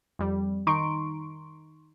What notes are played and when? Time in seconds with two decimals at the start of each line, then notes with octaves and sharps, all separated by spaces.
0.19 F2 G3
0.67 D#3 D#4 A#5 C6 C#6 D7